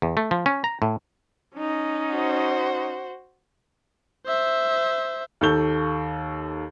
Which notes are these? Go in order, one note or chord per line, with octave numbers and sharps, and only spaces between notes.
E2
A3
F3
C#4
A#5
A2
C#4 D#4
F#4 C5
C5 E5
D#2 A4 C#6 G6 G7